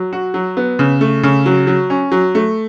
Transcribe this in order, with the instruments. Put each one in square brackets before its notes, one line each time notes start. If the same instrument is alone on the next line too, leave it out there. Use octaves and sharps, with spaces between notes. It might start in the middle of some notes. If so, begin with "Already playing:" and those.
Already playing: [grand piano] F#3
F#4
F#3
B3
C#3
A3
C#3
F#3
F#3
C#4
F#3
A3